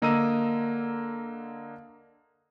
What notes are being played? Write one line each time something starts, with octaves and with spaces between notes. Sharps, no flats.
D3 A#3 D#5 A#5 E6 D#7